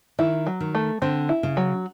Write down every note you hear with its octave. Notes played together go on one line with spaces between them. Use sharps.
D#3 E4
F#3
D#3
A3
D3 C4
E4
C#3
F#3